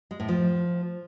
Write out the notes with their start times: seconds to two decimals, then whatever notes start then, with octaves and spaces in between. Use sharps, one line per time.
0.11 G#3
0.20 A2
0.29 F3